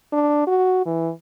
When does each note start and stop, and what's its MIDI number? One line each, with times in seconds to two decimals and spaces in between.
0.13 0.46 62
0.47 0.81 66
0.86 1.11 52